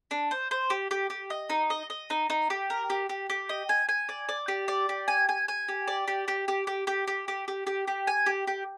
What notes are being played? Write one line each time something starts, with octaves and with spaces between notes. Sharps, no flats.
D4
C5
C5
G4
G4
G4
D#5
D#4
D#5
D#5
D#4
D#4
G4
A#4
G4
G4
G4
D#5
G#5
G#5
D5
D5
G4
D5
G4
G#5
G#5
G#5
G4
D5
G4
G4
G4
G4
G4
G4
G4
G4
G4
G4
G#5
G4
G4